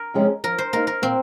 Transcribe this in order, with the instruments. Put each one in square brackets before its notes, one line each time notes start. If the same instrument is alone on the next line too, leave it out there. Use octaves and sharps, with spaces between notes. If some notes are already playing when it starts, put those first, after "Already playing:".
Already playing: [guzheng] A#4
[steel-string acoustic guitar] C3 F3 G#3 C#4
[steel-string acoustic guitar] F3 [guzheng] A#4
[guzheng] C5
[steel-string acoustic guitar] A#3 D#4 [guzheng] A#4
[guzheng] A#4
[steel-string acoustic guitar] A#2 [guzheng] C4